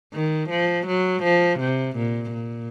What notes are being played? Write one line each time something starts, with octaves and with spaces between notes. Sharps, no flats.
D#3
F3
F#3
F3
C3
A#2
A#2